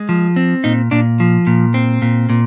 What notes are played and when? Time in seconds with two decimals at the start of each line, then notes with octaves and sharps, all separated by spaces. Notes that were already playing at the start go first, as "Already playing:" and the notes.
Already playing: G#3
0.09 F3
0.36 C4
0.64 A#2 D#4
0.91 A#2 D4
1.20 F3
1.47 A#2
1.74 C4
2.02 A#2
2.29 A#2